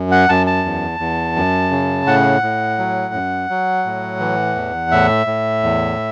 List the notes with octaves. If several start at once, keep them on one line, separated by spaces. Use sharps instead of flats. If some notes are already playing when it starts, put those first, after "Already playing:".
Already playing: F#2
F#5
F#2 A5
A5
E2
E2
F#2
C#3
A2 F#5
A2
F#3
F#2
F#3
A2
E3
E2
A2 E5
A2
E2